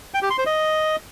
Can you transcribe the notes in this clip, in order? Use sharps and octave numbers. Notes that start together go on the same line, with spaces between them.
G5
G4
C6
C5
D#5